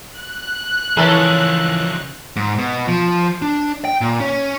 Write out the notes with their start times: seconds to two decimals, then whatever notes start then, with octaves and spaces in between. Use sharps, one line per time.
0.17 F#6
0.97 C#3 E3 F3 C#4 A4 A#4
2.36 G#2
2.58 B2
2.87 F3
3.42 D4
3.85 G5
4.01 A#2
4.20 C#4